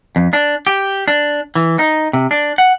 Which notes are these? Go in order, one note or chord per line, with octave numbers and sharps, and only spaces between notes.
F2
D4
G4
D4
E3
D#4
C3
D4
F#5